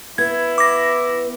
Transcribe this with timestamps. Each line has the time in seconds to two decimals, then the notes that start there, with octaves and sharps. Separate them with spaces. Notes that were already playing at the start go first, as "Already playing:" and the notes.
0.18 B3 E4 G#6
0.58 D6 A#6